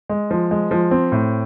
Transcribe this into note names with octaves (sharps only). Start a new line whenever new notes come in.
G#3
F3
G#3
F3
C4
A2